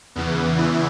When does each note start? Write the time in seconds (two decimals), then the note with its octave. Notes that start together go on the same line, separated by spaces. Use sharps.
0.15 E2 C#3 E3 B3
0.58 E4